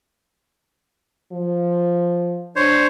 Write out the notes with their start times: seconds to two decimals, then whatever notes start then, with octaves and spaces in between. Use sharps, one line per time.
1.32 F3
2.56 D4 C5 C#5